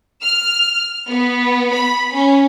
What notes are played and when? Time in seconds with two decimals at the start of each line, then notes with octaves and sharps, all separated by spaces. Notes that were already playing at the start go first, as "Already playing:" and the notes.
0.23 F6
1.08 B3
1.74 B5
2.12 C#4